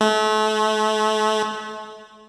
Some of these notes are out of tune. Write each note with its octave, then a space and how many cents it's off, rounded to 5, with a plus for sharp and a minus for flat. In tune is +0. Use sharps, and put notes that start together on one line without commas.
A3 -35